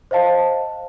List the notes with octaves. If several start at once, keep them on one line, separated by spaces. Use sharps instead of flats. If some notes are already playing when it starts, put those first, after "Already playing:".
C5 D#5 F5 A5